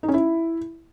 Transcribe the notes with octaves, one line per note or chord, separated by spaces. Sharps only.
D#4
C#4
E4